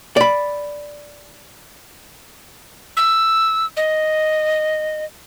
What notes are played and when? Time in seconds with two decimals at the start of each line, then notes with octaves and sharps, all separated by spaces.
0.17 D5 B5
2.97 E6
3.77 D#5